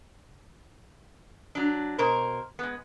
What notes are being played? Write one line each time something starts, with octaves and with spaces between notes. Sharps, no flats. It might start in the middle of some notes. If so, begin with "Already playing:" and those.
F#3 D4
B2 A#4 C5
G#3 B3